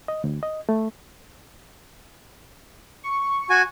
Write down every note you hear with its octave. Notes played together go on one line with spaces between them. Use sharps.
D#5
D2
D#5
A3
C#6
F#4 G#5